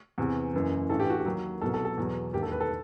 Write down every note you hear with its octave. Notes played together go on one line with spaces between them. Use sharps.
E2 C3 E3
F#1 F#2 E3
A1 G2 E3 A4
G4
F#4
G4
D#2 D#3 F#3
C2 B2 F#3 A4
A4
A4
E2 B2 F#3
E1 D#2 D#3 G4
A4
B4
A4